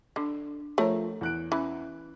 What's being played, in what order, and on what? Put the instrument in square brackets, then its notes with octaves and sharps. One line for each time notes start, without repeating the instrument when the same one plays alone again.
[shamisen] D3 [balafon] D4
[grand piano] F3 [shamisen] A3 A#4 [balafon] C#5
[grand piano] E2 F#6 D7
[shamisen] E3 [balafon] C#4